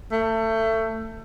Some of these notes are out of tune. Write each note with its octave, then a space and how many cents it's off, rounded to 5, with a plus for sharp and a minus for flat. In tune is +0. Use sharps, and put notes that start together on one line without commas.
A3 +25